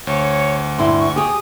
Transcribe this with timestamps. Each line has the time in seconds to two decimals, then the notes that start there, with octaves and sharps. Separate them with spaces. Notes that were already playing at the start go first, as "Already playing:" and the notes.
0.07 D2 C#5
0.78 G2 E4 C6
0.99 C#6
1.16 G4 G#4 D#6